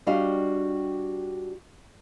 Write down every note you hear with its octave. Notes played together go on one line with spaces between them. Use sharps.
G3 D4 F#4 G4 D#5 F5